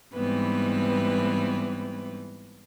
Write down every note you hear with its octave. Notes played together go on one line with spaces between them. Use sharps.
G#2 E3 G3 B3 C4 B4